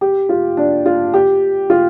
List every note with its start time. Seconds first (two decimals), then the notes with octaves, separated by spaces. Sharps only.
0.01 G4
0.29 F4
0.57 D4
0.86 F4
1.14 G4
1.70 F4